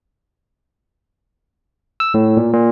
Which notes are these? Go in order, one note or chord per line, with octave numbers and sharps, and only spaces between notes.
E6
A2
A#2
A#2